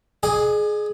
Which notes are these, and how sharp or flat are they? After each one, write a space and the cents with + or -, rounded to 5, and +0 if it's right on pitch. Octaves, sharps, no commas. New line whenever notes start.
G#4 +20 D#5 -45 G#5 +0